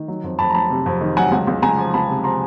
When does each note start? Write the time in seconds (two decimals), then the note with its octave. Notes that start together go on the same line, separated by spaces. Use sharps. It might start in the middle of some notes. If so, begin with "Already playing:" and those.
Already playing: D#3
0.08 F#3
0.24 F2
0.39 F2 A5 B5
0.50 A#5
0.55 F#3 A5 B5
0.70 C3
0.86 F2
1.01 D#3
1.17 F#3 F#5 G#5
1.32 C#2
1.47 C#2
1.62 C#2 G#5 A#5
1.78 F3
1.94 C#2 A5 B5
2.09 C3
2.24 F3 A#5 C6